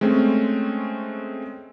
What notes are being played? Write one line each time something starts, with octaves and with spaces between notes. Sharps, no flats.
G#3 A3 C4 C#4